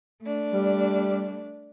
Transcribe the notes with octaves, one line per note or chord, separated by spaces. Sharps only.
A3 D4
G3